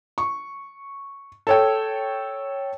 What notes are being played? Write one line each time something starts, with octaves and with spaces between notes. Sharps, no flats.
C#6
A4 C#5 G5